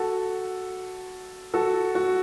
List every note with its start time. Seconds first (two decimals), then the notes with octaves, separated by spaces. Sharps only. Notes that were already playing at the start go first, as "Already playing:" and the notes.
Already playing: F#4 A4
1.54 F#4 A4
1.95 F#4